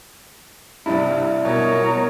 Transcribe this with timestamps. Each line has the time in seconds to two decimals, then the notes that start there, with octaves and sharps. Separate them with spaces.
0.86 G2 C3 G3 D4 E4
1.45 B2 A#4 C#5